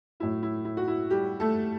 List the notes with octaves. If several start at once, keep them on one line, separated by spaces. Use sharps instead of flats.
A2 F#3 A3 E4
E4
E4
F#4
E4
G3 G4
A3 A4